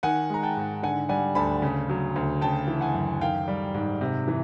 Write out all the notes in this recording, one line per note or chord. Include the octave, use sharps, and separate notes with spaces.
D#3 F#5 G#5
G#3 A#5
G5 A5
G#2
D3 F#5 G#5
G3 F#5 G#5
D2 A5 B5
C#3
F#3
D2
C#3 G5 A5
E3
F#5 G#5
F#2
D#3 F5 G5
G3
G#2
C3
E3